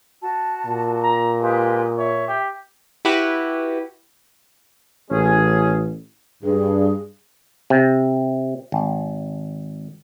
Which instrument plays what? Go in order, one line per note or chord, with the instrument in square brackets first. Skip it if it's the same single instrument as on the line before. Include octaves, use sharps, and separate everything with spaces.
[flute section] F#4 A5
[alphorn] A#2
[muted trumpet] A#5
[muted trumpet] G#3 [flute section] F4 G4 B4
[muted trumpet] C#5 [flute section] E5
[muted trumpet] G4
[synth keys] E4 F#4 G4 B4
[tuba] A1 [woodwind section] C#4 G#4
[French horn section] G2 [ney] G#4
[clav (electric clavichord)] C3
G#1